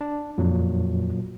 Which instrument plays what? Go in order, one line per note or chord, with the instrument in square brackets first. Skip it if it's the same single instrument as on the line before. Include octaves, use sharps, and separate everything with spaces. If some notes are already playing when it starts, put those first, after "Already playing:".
[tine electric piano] D4
[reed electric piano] F2 [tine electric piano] A#2 F#3